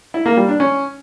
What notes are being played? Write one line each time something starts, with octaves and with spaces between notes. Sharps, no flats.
E4
A#3
G3
D4
C#4